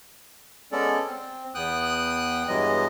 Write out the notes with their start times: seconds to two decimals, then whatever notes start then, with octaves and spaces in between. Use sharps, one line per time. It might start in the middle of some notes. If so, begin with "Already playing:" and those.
0.72 G#3 B3 C#4 A4 D5
1.07 C4
1.55 E2 B3 G5 D#6 F#6
2.48 G2 E3 F#3 G#3 B3 D#5